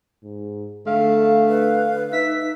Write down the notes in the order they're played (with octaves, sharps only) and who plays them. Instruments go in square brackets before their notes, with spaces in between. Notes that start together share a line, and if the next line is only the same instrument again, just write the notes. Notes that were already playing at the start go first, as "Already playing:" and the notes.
[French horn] G#2
[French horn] D3 [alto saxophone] A3 [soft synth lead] F5
[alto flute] B4
[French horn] D#4 [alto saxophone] E5 [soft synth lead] B6